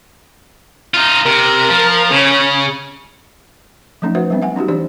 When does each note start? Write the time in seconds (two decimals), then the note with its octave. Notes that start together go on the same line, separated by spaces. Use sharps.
0.94 D#4 F4
1.26 C3 A#4
1.69 F3
2.12 C#3 C#4
4.02 F3 F#3 A3 C#4 D#4
4.15 F#4 B4 C5 E5 F#5
4.30 F#3 G3 B3 C4 D4
4.42 E5 F#5 G#5
4.56 C#4 D#4 F#4 G4
4.68 E3 D4 G4 C5 D5